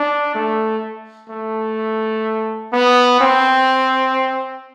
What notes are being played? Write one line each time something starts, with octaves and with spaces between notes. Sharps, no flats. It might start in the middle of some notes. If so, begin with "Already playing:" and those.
Already playing: D4
A3
A3
B3
C4